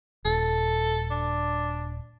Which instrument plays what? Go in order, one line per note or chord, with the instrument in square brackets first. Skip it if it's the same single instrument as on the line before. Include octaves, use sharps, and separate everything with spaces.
[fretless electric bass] D#1 [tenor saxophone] A4
[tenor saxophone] D4